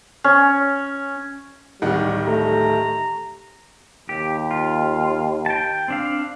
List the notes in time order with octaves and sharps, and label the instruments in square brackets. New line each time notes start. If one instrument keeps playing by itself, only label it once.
[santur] C#4
[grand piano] D1 D#3 F#5 [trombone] G3 [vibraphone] G4
[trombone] A3 [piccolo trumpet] A#5
[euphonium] D#2 [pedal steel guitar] G4
[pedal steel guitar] F4
G5 A5
C4 D4 F5